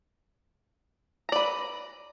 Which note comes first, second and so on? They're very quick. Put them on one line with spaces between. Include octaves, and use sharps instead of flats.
A#5 D5 B4